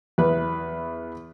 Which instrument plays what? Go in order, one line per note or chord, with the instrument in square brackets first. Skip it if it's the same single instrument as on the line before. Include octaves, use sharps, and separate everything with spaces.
[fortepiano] E2 B4